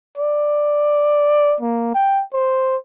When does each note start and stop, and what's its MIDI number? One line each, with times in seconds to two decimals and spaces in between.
0.18 1.55 74
1.61 1.94 58
1.95 2.23 79
2.33 2.76 72